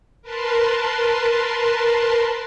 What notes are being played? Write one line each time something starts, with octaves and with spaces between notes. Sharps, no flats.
A#4 B4 A5 C6